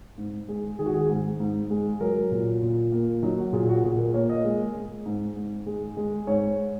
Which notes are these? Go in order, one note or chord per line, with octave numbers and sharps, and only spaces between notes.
G#2
G#3
D#3 G#4
F#4
G#4
G#2
G#2
G#3
F#3 A#4
A#2
A#2
A#3
F#3 D#4
F#4
A#2 G#4
F#4
A#2 G#4
A#4
A#3 C#5
D#5
G#3
G#3
G#2
G#2
G#3
G#3
G#2 C#5